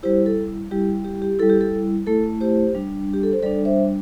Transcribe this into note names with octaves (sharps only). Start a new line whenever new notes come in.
G3 E4 G4 C5
A4
G3 E4 G4
G4
G4
G3 E4 A4
G4
A4
A3 E4 A4
G4 C5
G3 D4
G4
A4
C5
G3 D4 A4 D5
C5 E5